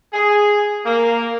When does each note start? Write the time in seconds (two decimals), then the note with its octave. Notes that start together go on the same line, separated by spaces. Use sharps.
0.13 G#4
0.85 A#3